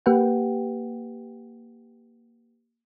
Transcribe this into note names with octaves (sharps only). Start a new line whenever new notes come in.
A#3 G4 B4 F#5 G5